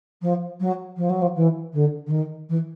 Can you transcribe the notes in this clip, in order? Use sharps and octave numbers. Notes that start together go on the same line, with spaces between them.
F3
F#3
F3
F#3
F3
E3
D3
D3
D#3
E3